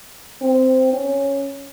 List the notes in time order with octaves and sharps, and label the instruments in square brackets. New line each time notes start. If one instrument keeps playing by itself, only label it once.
[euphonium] C4
C#4